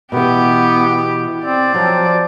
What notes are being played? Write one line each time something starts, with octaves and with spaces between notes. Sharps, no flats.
B2 E3 B3 G4
C4 D5
F3 F#3